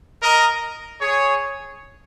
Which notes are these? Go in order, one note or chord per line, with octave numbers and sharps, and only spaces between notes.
A#4 D#5
G#4 C#5